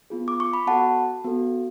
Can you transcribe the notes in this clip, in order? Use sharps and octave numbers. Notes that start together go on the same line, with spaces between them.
B3 F4 G#4
D6
C#6
B5
B3 F#4 A4 F#5 A5
B3 F#4 A4